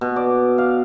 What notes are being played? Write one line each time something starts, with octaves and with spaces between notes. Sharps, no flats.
B2
D5
F5